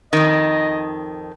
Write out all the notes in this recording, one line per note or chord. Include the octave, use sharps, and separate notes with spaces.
F2 D#3 D#5